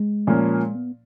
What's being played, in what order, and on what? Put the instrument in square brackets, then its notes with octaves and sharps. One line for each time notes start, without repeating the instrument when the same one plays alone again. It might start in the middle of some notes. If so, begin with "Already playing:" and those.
Already playing: [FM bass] G#3
[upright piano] A#2 F3 A#3 C#4
[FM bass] B3